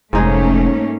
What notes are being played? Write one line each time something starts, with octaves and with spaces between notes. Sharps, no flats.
F1 G#2 A3 A#3 C#4 D#4 G#4